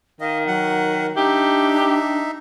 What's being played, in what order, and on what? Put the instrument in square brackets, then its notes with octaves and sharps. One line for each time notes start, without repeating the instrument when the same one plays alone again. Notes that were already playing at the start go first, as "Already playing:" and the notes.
[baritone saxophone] D#3 [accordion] D#5 [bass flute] F5
[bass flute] F#3 [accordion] F#5
[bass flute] D4 [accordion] D#4 E5 [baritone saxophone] G4